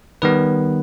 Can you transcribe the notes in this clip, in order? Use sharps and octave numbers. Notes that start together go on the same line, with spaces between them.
D#3 G3 B3 B4